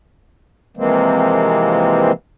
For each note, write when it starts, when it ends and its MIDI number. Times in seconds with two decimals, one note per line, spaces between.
0.77 2.12 48
0.77 2.12 52
0.77 2.12 53
0.77 2.12 56
0.77 2.12 58
0.77 2.12 60